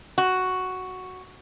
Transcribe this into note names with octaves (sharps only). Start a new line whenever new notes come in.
F#4